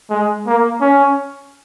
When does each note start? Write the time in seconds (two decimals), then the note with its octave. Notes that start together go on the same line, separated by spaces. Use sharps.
0.10 G#3
0.46 A#3
0.81 C#4